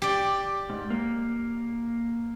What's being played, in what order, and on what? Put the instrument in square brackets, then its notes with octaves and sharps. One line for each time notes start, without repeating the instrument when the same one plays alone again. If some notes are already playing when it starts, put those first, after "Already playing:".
[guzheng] G4 D5
[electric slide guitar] G#2
A#3